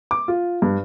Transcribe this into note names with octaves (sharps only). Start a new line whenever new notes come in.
D6
F4
G2